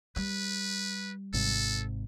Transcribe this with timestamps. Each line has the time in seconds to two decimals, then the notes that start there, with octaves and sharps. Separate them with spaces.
0.16 G3 B4
1.33 G#1 G#2 C3 A4